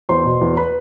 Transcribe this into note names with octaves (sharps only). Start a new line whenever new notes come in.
E2 C5 C6
B2
E2
B4 B5